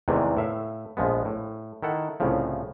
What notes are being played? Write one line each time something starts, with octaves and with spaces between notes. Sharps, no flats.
E2 C3 D#3 E3 G#3 A3
A2 E5 F5
A#1 F3 G#3 B3
A2
D#3 E4 A4 F#5
C2 A2 C#3 F3